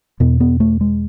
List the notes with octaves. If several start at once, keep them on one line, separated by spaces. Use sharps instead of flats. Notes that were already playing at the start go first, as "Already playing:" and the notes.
E2 B2 B3
B3
A3
G#3